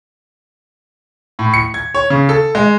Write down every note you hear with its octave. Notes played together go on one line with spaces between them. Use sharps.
A2
C#7
G#6
C#5
C#3
A4
G#3